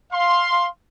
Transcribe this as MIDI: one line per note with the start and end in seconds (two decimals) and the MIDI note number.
0.12 0.67 77
0.12 0.67 84